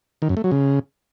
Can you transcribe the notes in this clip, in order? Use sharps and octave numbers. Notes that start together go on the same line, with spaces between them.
D#3
F#2
A3
F#3
C#3